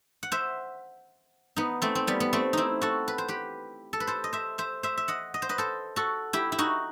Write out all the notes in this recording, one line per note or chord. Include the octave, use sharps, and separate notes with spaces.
F#5
C5 E5
B3 D#4
A3 C4
C4
G3 B3
B3
A3 C4
C4 D#4 E4
F#4 A4
B4
C5
G4 B4
A4
B4
A4 C5
D#5
C5 E5
C5 E5
C5 E5
E5
D#5 F#5
D#5
C5
B4 D#5
A4 C5
F#4 A4
E4 G4
E4
D#4 F#4